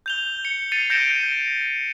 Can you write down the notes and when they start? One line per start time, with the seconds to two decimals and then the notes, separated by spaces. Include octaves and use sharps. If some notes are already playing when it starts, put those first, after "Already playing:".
0.06 G6 F7 G7
0.45 C#7
0.72 A6 C7 C#7 D#7 F7
0.90 G6 A#6 C#7 D7 E7 G7